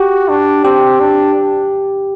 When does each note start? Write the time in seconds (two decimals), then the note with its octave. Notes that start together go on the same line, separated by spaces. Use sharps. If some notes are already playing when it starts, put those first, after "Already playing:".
Already playing: F#4 G4
0.28 D4
0.64 C4 G4
1.00 D4